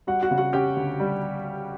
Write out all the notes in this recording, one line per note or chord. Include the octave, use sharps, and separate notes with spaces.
G3 F#4 F#5
F#4 F#5
C#3
F#4 F#5
C#4 G4 G5
D2
G3